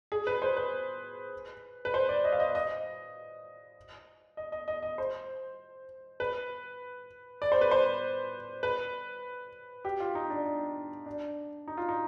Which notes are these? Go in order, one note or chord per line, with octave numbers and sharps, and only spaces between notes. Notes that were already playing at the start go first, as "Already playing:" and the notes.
G#4
B4
C5
B4
B4
C5
D5
D#5
F5
D#5
D#5
D#5
D#5
D#5
D#5
C5
B4
D5
C5
B4
C5
B4
G4
F4
D#4
D4
D#4
D4
D#4
F4
D#4